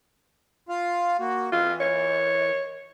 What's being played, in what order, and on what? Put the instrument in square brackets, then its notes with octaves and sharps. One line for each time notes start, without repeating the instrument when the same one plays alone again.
[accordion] F4 F5
A#3 F#4
[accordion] E3 [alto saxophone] F4
[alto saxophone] C#5